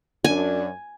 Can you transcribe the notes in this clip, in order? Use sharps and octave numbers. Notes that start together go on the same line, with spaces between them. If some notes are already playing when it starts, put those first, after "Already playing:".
F#2 D4 G#5